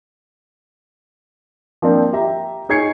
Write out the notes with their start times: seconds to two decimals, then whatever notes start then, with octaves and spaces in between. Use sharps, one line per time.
1.82 F3 A#3 C4 D4
2.13 G4 E5 A#5
2.69 D#4 G#4 C#5 G#6 C7 C#7